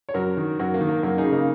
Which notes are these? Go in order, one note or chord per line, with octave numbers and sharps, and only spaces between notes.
C#5
F#2 F#4 A#4
D#3
F#2 F#4 A#4
A#3
D#3
A#3
F#2 A#3
D#4 G#4
C#3
A#3 D#4